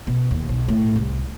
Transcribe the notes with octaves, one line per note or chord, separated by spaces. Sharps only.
B2
D#2
B1
A2
C2